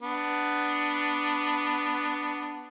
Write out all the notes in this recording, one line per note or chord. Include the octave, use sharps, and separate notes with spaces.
B3 D4